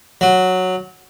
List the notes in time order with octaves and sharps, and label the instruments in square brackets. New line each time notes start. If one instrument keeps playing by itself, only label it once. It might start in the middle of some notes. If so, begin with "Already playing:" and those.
[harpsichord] F#3